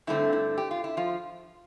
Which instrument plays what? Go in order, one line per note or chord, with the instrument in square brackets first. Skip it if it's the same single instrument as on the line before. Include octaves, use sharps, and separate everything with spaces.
[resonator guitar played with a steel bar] G2 D3 A3 C4 E4
E4
G4
F4
E4
F3 F4